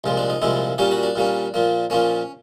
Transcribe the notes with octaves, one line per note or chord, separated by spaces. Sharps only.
C2 A#2 F3 G#3
D4
D#4
C2 A#2 F3 G#3 E4
A#2 G3 A#3 C#4 G4
F#4
D4
A#2 G3 A#3 C#4
A#2 F3 A#3
A#2 F3 A#3 C#4